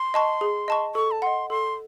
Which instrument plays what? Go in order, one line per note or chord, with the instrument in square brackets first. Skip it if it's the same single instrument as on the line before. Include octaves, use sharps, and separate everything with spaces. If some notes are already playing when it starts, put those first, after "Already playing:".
Already playing: [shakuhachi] C6
[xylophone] D#5 A5 C#6
G#4
D#5 A5 C#6
[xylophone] A4 [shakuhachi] C#6
[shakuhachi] A5
[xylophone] D#5 F#5 [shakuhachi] C6
[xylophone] A4 [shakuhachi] C6